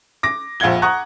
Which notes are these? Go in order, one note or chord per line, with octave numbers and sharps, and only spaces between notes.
D6 A#6
A#1 F2 F5 F#5 G#6 G7
F#5 A#5 C#6 D#6 F#6